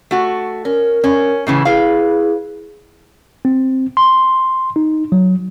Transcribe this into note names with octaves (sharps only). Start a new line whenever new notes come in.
A3 F#4
C#4 A#4
C#4
A2 C#3 E3
E4 G#4 B4 F5
C4
C6
D#4
F#3